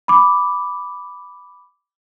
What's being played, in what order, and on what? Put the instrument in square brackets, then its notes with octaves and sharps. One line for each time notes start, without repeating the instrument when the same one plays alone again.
[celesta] B5 D6